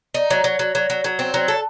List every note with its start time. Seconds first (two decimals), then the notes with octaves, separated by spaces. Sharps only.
0.14 D#4
0.30 F#3
0.44 F#3
0.59 F#3
0.75 F#3
0.90 F#3
1.04 F#3
1.19 C4
1.34 F#3
1.48 A4